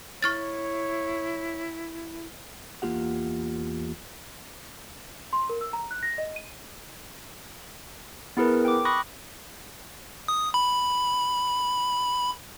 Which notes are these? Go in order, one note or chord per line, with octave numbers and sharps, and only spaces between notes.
E4 C#5 C#6 F6 A6
E2 A#3 F4 G4 F#5
C6
A#4
E6
A#5
F#6
A#6
D#5
D#7
B3 E4 G#4 A#4 B4
G5 D6
B5 C#6 D#6 F#6 A#6
D#6
B5